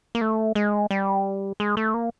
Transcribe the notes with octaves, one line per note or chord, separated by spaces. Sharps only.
A#3
A3
G#3
G3
G#3
A3
A#3